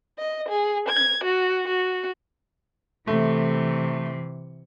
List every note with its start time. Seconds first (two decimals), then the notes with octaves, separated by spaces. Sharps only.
0.19 D#5
0.49 G#4
0.89 G#6
1.24 F#4
1.67 F#4
3.07 C3 E3 A3